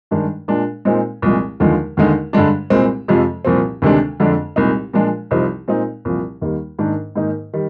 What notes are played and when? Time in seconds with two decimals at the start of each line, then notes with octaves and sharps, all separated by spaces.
0.11 G2 D#3 G#3 D4
0.48 A#2 G#3 D4
0.85 A#2 G#3 C4 D#4
1.22 C2 A#2 F3 G#3
1.60 D#2 D3 F3 G#3
1.97 D#2 D3 G#3 D#4
2.33 G2 D3 G#3 D4
2.70 C2 A#2 G#3 C4
3.08 F2 C3 F3 G#3
3.45 C2 A#2 F3 C4
3.82 D2 C3 D#3 G#3 D4
4.20 F2 D3 G#3 D4
4.56 C2 A#2 G#3 D#4
4.93 A#2 F3 G#3 D4
5.31 C2 C3 F3 C4 D#4
5.68 A#2 G#3 C4 D#4
6.05 C2 A#2 F3
6.41 D#2 D#3 G3 A#3
6.79 G#2 D#3 A#3 D4
7.15 G#2 D#3 A#3 D#4
7.53 D#3 G3